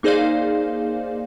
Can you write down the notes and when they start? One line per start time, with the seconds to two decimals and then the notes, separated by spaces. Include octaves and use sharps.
0.03 A#3 D#4 G#4 C5 D5 F5